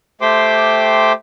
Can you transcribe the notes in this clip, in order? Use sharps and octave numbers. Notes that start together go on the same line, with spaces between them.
A3 G4 C5 G5 C6 D6